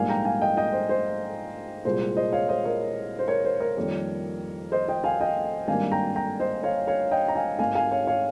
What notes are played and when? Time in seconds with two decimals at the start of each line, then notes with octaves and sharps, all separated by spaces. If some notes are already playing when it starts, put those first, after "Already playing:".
Already playing: A#1 G#2 G3 A#3 F5 G#5
0.09 G5 A#5
0.25 F5 G#5
0.41 D#5 G5
0.57 D#5 G5
0.72 C5
0.89 C5
1.85 C2 A#2 G#3 C5
2.17 C5 D#5
2.33 C#5 F5
2.49 C5 D#5
2.64 A#4 C#5
3.19 C5
3.28 A#4 C#5
3.45 C5
3.60 A#4 C#5
3.77 F2 D#3 G3 A#3
4.72 C5 D#5
4.88 D#5 G5
5.04 F5 G#5
5.21 D#5 G5
5.67 G#1 G2 G3 A#3 F5 G#5
5.92 G5 A#5
6.16 G5 A#5
6.40 C5 D#5
6.63 C#5 F5
6.87 C#5 F5
7.11 D#5 G5
7.28 A#5
7.35 F5 G#5
7.59 G#1 G#2 D#3 F5 G#5
7.75 F5 G#5
7.91 C#5 F5
8.07 C#5 F5